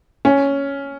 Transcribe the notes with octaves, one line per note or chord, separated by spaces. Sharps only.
C#4